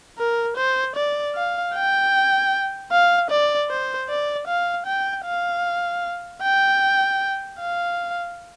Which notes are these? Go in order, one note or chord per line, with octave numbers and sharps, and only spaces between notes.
A#4
C5
D5
F5
G5
F5
D5
C5
D5
F5
G5
F5
G5
F5